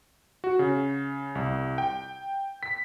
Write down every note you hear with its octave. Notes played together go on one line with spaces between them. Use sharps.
F#4
C#3
C2
G5
B6